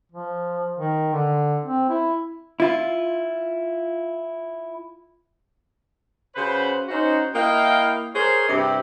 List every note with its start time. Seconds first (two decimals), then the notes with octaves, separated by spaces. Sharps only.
0.12 F3
0.79 D#3
1.13 D3
1.65 C4
1.89 E4
2.60 E4 F4
6.36 C#3 F#4 B4 C5
6.89 C#4 D#4 F#4 C5
7.33 A#3 E4 D#5 F5 G5
8.14 G#4 A#4 C5 C#5
8.47 G2 C3 E4 G4